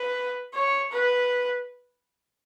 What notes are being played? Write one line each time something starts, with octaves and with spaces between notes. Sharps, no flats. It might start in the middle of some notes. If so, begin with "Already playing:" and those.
Already playing: B4
C#5
B4